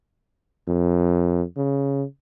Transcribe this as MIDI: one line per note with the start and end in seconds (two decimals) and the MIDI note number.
0.67 1.42 41
1.56 2.04 49